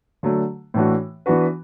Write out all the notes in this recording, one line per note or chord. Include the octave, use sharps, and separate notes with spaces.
D3 F#3 A3
A2 E3 A3 D4 F#4
E3 B3 D4 F#4 B4